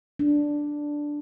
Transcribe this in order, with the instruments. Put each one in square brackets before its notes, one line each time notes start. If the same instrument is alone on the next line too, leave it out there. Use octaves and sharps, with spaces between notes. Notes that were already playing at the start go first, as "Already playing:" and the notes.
[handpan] D4